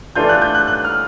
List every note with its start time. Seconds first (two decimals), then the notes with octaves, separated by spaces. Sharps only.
0.16 E3 A3 D4 F4 G6
0.29 F#6
0.42 G6
0.55 F#6
0.67 F#6
0.84 F6